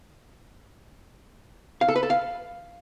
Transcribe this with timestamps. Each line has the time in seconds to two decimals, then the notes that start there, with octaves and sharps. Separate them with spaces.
1.81 F5
1.88 A4
1.96 B4
2.03 A4
2.10 F5